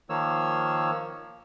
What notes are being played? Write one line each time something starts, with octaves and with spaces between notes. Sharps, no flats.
D#3 F3 A#3 C#5 E6